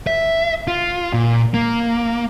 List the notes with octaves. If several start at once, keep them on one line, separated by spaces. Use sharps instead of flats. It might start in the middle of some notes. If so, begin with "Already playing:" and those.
E5
F4
A#2
A#3